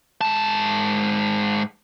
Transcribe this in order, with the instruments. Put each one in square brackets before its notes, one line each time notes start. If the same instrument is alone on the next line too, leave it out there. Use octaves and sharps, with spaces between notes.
[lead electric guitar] G#2 A5